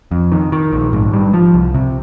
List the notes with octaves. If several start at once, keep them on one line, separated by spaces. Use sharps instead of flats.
F2
D#3
D#3
A#1
G#2
G3
F3
C2
C3